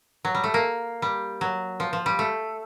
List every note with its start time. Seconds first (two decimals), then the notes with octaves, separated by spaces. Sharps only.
0.25 F#3
0.35 G3
0.44 A3
0.54 A#3
1.02 G3
1.41 F#3
1.80 F3
1.93 F3
2.06 G3
2.19 A3